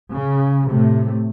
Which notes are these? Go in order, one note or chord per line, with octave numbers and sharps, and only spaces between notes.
C#3
A2 C3 A3